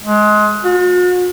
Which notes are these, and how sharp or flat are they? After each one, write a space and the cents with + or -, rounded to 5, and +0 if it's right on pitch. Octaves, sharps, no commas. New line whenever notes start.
G#3 +25
F#4 -45